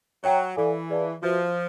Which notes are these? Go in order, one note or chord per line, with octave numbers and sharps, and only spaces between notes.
F#3 C#5 E5 G5 A#5
E3 E4 A4 D5 F5 G#5
G#4 B4 D5 F5 A5
F3 F#4 B4 E5